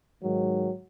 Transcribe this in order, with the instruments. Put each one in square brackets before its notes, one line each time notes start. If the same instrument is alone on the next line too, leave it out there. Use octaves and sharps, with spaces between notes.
[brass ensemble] G#2 D#3 F#3 G#3